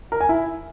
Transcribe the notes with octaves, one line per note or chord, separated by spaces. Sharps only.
A#4
G#5
E4